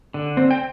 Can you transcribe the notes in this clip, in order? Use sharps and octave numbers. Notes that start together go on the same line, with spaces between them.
D3
C4
G5